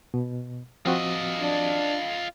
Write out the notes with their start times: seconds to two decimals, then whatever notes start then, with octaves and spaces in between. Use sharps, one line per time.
0.14 B2
0.86 F3 C4 F4 F#4 D#5
1.38 D4